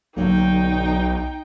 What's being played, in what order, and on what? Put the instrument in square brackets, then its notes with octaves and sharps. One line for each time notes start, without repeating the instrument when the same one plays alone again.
[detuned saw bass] B1 [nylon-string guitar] D3 F#3 A#3 [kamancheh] D#4 G5